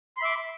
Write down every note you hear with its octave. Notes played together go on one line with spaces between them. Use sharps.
E5 B5 C6 D6